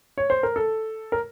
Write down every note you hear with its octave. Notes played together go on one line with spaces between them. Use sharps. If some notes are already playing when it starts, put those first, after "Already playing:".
C#5
C5
A#4
A4
A#4